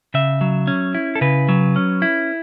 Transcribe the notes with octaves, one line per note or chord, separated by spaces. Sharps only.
C#3 E5
F#3
C#4
E4
A4
C#3 B4
F#3
C#4
E4